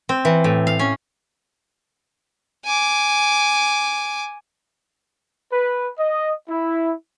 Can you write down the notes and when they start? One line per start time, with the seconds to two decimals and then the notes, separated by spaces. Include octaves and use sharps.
0.09 C4
0.25 E3
0.44 A2
0.67 F5
0.79 C#4
2.65 G#5 D6
5.52 B4
5.99 D#5
6.50 E4